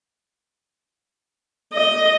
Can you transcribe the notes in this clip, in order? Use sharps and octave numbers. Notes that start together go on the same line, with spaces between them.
D#5